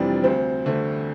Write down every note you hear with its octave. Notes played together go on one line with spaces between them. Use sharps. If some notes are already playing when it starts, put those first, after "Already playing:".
Already playing: F1 F2 E3 G3 C4 D4 D5
D2 C4 C5
D3 A3 C4